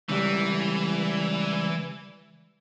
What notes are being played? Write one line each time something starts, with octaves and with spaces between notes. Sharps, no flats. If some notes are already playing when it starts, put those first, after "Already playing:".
C#2 E3 G3